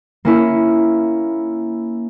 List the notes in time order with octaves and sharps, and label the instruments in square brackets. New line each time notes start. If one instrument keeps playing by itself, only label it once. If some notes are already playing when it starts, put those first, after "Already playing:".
[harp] A#3 C#4 E4